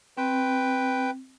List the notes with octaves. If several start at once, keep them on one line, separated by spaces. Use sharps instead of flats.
C4 B4 G5